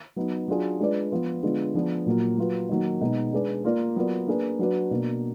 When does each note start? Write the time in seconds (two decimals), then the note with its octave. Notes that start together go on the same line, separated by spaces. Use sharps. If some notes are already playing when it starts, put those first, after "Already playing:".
0.16 F#3 B3 D#4
0.48 F#3 D4 F4 G#4
0.80 G#3 D4 F4 B4 D5
1.12 F3 B3 F4
1.43 D3 G#3 B3 F4
1.75 F3 B3 D4 G#4
2.06 A#2 F#3 A#3 F4
2.38 F#3 A#3 F4 B4
2.69 D#3 F#3 A#3
3.01 B2 G#3 B3 D#4 G#4
3.33 G#3 D4 G#4 B4 D5
3.64 A#3 F4 A#4 D5
3.96 F#3 B3 F4 A#4 D5
4.27 A#3 D4 G#4 B4
4.59 F#3 D4 F#4 B4 D5
4.91 B2 A#3 D4 F#4